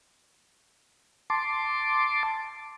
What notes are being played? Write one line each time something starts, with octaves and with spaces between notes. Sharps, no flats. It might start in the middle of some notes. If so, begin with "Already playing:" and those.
A5 C6 D6